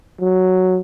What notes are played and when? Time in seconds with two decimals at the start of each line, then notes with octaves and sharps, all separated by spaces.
0.21 F#3